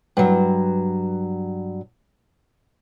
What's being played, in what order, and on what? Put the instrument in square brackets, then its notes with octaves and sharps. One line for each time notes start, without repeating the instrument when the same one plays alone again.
[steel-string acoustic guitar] G2 F#3